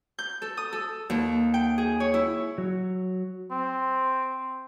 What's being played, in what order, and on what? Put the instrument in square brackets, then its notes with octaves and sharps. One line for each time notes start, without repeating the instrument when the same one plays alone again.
[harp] G6
A4
D#6
A4
D#2
G5
G#4
C#5
E4
[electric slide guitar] F#3
[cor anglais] C4